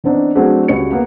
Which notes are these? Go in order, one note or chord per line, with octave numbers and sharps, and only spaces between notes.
E3 B3 C4 D4 D#4
F#3 A3 C4 D4 F#4 G#4
C#2 G3 F#4 C#5 C#7
A#3 B3 F#5